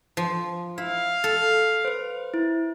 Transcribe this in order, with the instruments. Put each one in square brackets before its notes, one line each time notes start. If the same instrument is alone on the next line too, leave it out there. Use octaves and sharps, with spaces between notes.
[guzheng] F3
[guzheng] E4 [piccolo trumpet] F5
[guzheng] A4
[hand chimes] B4 C5
E4